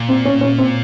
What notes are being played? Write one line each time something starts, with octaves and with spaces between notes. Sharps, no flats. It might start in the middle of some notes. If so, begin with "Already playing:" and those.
Already playing: A#2
C4
C#4
C#4
C4